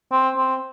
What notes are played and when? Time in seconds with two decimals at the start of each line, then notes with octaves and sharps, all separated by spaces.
0.11 C4
0.37 C4